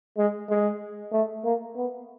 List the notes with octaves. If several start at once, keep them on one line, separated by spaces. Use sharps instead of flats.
G#3
G#3
A3
A#3
B3